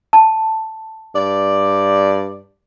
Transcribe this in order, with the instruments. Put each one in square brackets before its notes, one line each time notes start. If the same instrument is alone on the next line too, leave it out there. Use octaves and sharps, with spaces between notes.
[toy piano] A5
[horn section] G2 D5